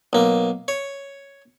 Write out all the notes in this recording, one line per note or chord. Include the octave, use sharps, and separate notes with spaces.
B1 A#3
C#5